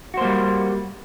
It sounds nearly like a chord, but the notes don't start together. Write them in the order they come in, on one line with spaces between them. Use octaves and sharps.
F#4 C5 A#3 G3